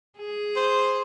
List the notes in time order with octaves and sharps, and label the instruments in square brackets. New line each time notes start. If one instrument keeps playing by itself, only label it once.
[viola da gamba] G#4
[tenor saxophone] C5